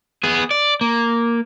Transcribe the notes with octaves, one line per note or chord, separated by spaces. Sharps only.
B3 G#4
D5
A#3